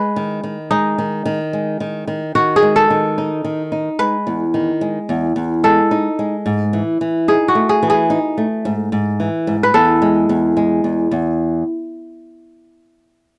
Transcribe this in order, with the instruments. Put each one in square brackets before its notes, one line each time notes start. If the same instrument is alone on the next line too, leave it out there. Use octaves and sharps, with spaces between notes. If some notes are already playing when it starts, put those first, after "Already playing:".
Already playing: [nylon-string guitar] G#3 [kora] B4
[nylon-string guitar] D#3
D#3
[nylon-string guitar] G#3 [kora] D#4
[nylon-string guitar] D#3
D#3
G#3
D#3
D#3
[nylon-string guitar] D#3 [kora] F#4
[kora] G#4
[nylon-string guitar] G#3
[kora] A4
[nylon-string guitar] D#3
D#4
D#3
D#4
[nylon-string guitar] G#3 [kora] B4
[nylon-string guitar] E2
D#3
G#3
E2
E2
[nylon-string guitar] G#3 [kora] A4
[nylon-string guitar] D#4
G#3
G#2
E3
E3
[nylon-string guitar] D#4 [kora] G#4
[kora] F#4
[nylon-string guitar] A3
[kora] G#4
[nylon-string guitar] E3
[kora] G#4
[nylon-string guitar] D#4
A3
G#2
G#2
E3
G#2
[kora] B4
[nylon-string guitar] E2 [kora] A4
[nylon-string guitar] G#3
E2
G#3
E2
E2